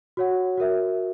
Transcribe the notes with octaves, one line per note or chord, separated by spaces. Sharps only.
F#4 C#5 F#5
F#4 A#4 E5